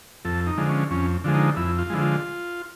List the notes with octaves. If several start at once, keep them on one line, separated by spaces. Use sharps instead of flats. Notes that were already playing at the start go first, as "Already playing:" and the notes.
F2 A4
D#4
D3 F3 G#3
C#4
F2 C#4
D3 F3 G#3
D#4
F2 E4
F4
D3 F3 G#3 E4
F4